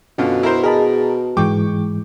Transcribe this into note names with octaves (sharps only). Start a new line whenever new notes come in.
F#2 B2 D3 F4
E4 A#4 C5
G#4 A#4 D#5 A5 B5
G#2 E3 G#3 G5 C#6 D6